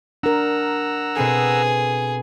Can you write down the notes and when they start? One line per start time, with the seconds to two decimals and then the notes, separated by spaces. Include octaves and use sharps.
0.23 D4 A#4 F#5 A#5 E6
1.16 B2 C4 G#4 A4